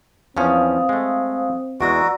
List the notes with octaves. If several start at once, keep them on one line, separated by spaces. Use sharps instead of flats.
E2 F3 C4 C#4 F5 D#6
G#3 A3
E2 G#3 F#4 D5 A#5 E6